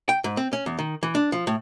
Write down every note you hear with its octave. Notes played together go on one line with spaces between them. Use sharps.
G5
G#2
C4
C#4
E2
D#3
E3
D4
F3
A2